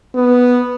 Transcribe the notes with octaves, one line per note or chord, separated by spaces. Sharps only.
B3